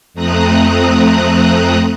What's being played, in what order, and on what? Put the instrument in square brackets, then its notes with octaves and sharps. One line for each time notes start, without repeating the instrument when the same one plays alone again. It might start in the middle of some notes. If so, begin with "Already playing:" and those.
[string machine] F2 A3 C4 A#5 D#6 F#6